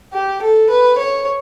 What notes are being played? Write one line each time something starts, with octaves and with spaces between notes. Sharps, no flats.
G4
A4
B4
C#5